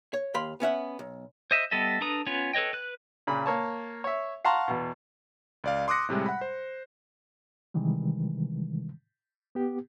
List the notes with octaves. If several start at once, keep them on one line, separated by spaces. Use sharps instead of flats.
C#5
D#2 F5 B5 C6
B3 C#4 E5 F#5
B1
C5 D#5 E5
G3 B3 A4 D#5 E5
D4 A4 B4 A#5 D#6
B3 C#4 F4 B4 C#5
A4 B4 C#5 D#5 G5
B4 F#6
A#2 C#3 B5
A#3 C#5 A5
C#5 E5
F5 F#5 A5 A#5 C6 C#6
E2 B2
C#2 D5 F5
C6 D6 D#6 F#6 A#6 C#7
A2 C3 G3 G#3
F#5 B5
C5
C3 D#3 E3 G3 G#3
B3 G4